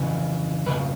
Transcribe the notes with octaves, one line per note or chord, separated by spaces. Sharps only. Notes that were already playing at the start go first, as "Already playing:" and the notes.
Already playing: F2 C#3 E3
F2 C#3 B4